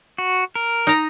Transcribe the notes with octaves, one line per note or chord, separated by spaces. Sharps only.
F#4
A#4
D#4 A#5